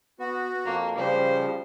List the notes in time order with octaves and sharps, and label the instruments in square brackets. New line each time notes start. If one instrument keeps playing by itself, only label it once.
[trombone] B3 [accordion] F#4
[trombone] F2 [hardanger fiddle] A#3
[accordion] C#3 F3 [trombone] G3 [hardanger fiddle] C5